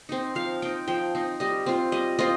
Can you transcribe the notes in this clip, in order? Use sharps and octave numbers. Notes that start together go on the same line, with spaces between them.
C4 D#4
F3 F5
C4 D#4 G5
F3 G5
C4 D#4
G3 D#5
C4 F4
G3 D#5
C4 F4 D#5